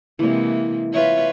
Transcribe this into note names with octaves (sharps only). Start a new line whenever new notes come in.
C3 E3 G#3 A#3
F4 B4 C#5 E5